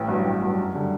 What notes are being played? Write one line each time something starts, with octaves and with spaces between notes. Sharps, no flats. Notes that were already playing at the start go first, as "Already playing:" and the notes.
Already playing: A1
G2 F#3
A1
G2 F#3
F#2
D3 G3